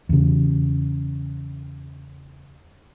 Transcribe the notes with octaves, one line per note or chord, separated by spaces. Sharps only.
E2 C#3